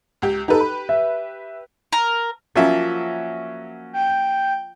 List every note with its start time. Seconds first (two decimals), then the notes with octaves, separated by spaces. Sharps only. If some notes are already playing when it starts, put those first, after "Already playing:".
0.22 C#2 G4
0.48 D#4 G4 A4 B4
0.60 B5
0.89 E5
1.92 A#4
2.56 F3 F#3 A#3 C#4 E5
3.93 G5